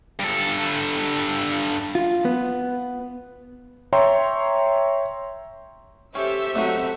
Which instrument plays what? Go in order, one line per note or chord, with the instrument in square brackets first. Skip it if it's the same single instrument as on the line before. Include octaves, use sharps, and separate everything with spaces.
[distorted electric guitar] G2 A4
[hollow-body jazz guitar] F4
B3
[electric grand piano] C#5 E5 G5 A#5 C6
[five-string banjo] C#4 [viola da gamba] G4 A4 C5 [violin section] E5
[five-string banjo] F#3 B3 D#4 [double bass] A3 [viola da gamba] C4 F#4